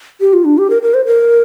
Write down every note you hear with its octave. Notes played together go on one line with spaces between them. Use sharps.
G4
F4
D4
G4
A#4
A#4
C5
A#4